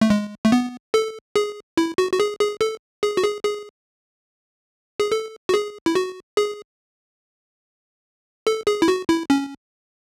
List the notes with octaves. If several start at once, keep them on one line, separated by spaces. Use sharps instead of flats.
A3
G#3
A3
B3
A4
G#4
E4
F#4
F#4
G#4
G#4
A4
G#4
F#4
G#4
G#4
G#4
A4
F#4
G#4
E4
F#4
G#4
A4
G#4
E4
F#4
E4
C#4